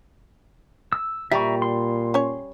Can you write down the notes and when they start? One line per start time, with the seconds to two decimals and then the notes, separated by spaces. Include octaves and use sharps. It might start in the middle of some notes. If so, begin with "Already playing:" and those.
0.93 E6
1.32 A#2 G3 E5 A#5 C#6
1.62 C6
2.14 C#4 C#5